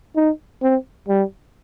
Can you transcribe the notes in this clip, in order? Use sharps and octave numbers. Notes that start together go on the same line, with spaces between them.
D#4
C4
G3